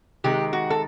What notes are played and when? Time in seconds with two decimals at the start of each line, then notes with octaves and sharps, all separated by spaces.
0.24 C3 D#3 G#3 G4
0.53 F#4
0.70 A4